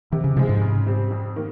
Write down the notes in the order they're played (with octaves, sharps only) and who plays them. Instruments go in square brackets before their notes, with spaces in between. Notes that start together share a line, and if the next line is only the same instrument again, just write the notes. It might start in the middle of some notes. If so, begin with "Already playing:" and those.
[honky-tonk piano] C3 [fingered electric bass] D#3
[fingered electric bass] C#3
[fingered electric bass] C3 [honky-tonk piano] F3 G#3
[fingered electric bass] G#2
[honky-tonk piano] C#3
G3 C4
F2
D#3 A#3